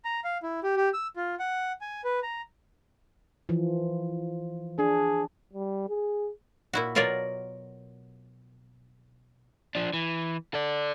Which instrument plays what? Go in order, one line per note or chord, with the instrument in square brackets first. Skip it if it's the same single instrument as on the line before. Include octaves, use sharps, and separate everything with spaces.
[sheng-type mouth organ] A#5
F5
E4
G4
G4
E6
F4
F#5
G#5
B4
A#5
[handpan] E3 F3
[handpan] D4 [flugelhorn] G#4
[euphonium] G3
G#4
[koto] A#2 E4 F#4
B2 F#3 F4 A#4 C#5 D5
[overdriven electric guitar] F3 D4
E3
A4 D5